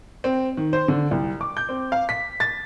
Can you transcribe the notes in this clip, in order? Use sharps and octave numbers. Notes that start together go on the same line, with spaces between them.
C4
D#3
C5
D3
C2
D6
G6
C4
F5
B6
A6